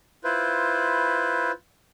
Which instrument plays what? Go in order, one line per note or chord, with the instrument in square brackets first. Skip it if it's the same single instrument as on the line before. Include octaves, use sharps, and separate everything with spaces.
[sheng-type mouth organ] E4 F4 B4 C5